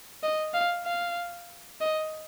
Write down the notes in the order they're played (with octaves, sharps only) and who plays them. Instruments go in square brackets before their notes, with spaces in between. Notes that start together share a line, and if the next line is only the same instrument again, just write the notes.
[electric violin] D#5
F5
F5
D#5